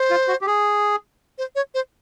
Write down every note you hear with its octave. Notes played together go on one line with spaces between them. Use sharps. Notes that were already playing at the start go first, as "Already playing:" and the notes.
Already playing: C5
F4
F#4
G4
G#4
C5
C#5
C5